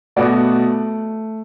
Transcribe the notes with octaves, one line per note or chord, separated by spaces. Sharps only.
B2 A3 B3 F#4 D5